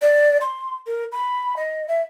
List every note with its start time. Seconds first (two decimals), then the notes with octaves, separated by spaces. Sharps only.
0.02 D5
0.41 C6
0.87 A#4
1.12 B5
1.56 D#5
1.88 E5